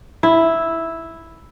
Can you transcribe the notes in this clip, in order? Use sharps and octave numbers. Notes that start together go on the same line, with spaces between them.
E4